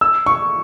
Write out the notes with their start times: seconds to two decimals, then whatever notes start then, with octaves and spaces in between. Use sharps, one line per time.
0.01 E6
0.26 C#6